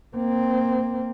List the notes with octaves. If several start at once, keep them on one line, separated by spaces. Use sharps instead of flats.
A#3 C4